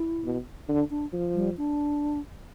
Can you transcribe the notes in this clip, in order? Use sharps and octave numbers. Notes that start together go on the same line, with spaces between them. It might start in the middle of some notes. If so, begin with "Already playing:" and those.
Already playing: E4
B2
D3 D4
D4
F3
G3
D4